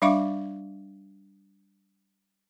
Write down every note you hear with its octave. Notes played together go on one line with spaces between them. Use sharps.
G3 D4 E5 F5 C#6 D6